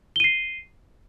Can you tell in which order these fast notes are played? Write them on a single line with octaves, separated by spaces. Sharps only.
G7 D#7 C7